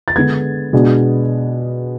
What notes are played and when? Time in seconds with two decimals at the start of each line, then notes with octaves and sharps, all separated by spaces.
0.08 A6
0.16 D3 G#3 B3 G#6
0.73 B2 G#3 B3 D4